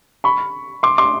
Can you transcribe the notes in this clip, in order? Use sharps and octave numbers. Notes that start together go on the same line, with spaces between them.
B5 C#6
C6 D6
C6 D6